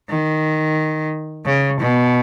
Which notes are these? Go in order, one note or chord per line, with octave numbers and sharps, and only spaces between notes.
D#3
C#3
B2